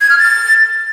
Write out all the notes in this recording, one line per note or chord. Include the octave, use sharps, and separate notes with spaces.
G#6
F6
A6